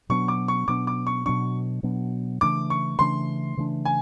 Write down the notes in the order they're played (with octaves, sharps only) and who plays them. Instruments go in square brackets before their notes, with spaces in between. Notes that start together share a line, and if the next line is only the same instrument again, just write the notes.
[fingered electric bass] B2 F#3 B3 D4 [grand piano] C#6
[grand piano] D6
C#6
[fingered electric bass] B2 F#3 B3 D4 [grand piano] D6
[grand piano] D6
C#6
[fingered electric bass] B2 F#3 B3 D4 [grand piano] C#6
[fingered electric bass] B2 F#3 B3 D4
[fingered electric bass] C#3 E3 A3 D4 [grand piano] D6
[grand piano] C#6
[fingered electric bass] C#3 E3 A3 D4 [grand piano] C6
[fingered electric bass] C#3 E3 A3 D4
[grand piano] G#5